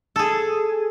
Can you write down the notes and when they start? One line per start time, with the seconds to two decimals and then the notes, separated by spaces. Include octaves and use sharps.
0.16 G#4 A4